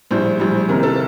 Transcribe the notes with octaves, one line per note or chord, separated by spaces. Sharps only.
A#1 A2 G3 C5
A#1 A2 G3
C2 C3 D#3 A#3 A#4
A4